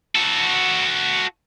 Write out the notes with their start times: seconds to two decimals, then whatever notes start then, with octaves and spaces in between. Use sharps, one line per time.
0.15 F#4 A4